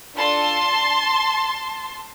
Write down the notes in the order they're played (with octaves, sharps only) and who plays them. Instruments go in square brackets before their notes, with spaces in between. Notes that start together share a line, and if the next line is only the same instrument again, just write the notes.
[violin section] D4 F4 A4 A5 C6